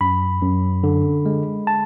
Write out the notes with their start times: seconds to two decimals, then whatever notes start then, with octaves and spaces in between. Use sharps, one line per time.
0.01 F#2 B5
0.42 F#2
0.84 D3
1.26 G#3
1.67 A5